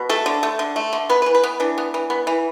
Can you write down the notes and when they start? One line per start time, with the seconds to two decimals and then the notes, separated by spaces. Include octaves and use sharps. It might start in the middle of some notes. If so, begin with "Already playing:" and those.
Already playing: B2
0.09 A3 A4
0.26 D3
0.43 A3
0.59 D3
0.76 A3
0.93 D3
1.09 B3 B4
1.22 B4
1.26 E3
1.35 B4
1.43 B3
1.60 E3 D4
1.78 B3
1.94 E3
2.10 B3
2.27 E3